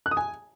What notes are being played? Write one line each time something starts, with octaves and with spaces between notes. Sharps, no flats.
F#6
D#6
G#5